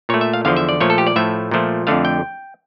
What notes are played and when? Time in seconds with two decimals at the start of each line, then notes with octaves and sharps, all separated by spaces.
0.09 A#2 A3 C#5
0.21 E5
0.33 F5
0.45 E2 D3 F3 F5
0.56 E5
0.69 D5
0.81 A#2 F3 A3 C#5
0.90 A4
0.98 G4
1.07 D5
1.16 A2 F3 A3 E5
1.51 A#2 F3 A3
1.87 F2 D3 A3 F5
2.05 G5